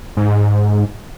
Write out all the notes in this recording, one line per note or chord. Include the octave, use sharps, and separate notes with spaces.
G#2